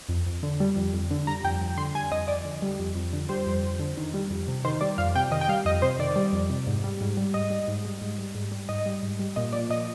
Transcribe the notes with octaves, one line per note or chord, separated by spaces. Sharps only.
F2
F2
D3
G3
F2
F2
D3
G3 A#5
F2 G5
F2
D3 C6
G3 G#5
F2 D#5
F2 D5
D3
G3
F2
F2
D3
G3 C5
F2
F2
D3
D#3
G3
F2
C3
D#3 C5
G3 D5
F2 F5
C3 G5
D#3 D#5
G5
G3 F5
F2 D#5
C3 C5
D#3 D5
G3
F2
C3
G#2
G3
G#2
G3
G#2 D#5
G3
G#2
G3
G#2
G3
G#2
G3
G#2 D#5
G3
G#2
G3
A#2 D#5
F3 D5
A#2 D#5